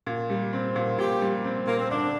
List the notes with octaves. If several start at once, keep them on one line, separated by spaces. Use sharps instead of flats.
A#2
G3
C4
A#2
A#2 G4
G3
C4
A#2 A#3
C4
D2 D4